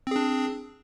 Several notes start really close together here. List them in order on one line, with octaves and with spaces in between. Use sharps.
C4 G#4 D4